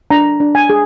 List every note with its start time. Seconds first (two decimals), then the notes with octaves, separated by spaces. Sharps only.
0.11 D4 A#5
0.40 D4
0.55 G#5
0.70 G#4